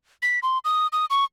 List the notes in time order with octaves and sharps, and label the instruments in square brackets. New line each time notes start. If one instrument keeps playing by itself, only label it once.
[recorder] B6
C6
D#6
D#6
C#6